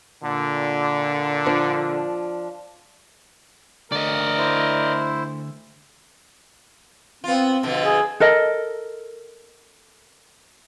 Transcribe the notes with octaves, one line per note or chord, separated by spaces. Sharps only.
A#2 D3
F3 D4
D3 A3 A#4 D5 D#5
E4 C5
B3 C4 F4
B2 D3 F3
G#4
A4 A#4 D#5